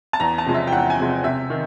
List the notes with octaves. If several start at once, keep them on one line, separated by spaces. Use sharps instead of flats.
A5
E2 A#5
A5
C3 F3 G#3
E5
G5
E2 F#5
G#5
C3 F3 G#3
C3 E5
D#3